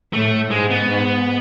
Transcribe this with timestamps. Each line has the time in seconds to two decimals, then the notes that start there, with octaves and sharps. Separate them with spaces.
0.13 A2 A3
0.51 G#2 G#3
0.70 B3
0.90 G#2